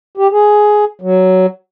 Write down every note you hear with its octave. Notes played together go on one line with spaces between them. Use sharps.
G4
G#4
F#3